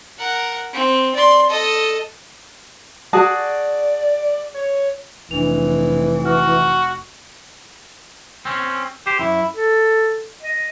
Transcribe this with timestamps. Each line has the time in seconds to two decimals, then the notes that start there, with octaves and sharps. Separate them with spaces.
0.19 A#4 F#5
0.73 C4
1.15 D5 C6
1.49 A4 D#5
3.13 F#4 G#4 D5 A5
4.54 C#5
5.31 F1 E3 D4 F7
6.25 F#4 F6
8.45 C4 C#4
9.07 G4 C5
9.19 F#2 E4
9.55 A4
10.43 D#5